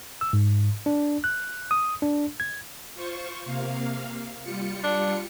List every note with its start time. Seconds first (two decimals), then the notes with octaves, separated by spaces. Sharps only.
0.21 E6
0.33 G#2
0.86 D4
1.24 F#6
1.71 D#6
2.02 D4
2.40 G#6
2.94 F4 C5 C#6
3.45 C3 A#3 F5
4.42 G3 F4 C#7
4.84 D4